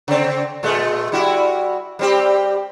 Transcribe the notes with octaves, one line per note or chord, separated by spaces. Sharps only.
C#3 C4
A#2 G#3 A3
G3 E4 F#4
G3 C4 G4